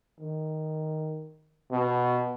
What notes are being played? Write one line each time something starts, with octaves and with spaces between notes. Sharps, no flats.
D#3
B2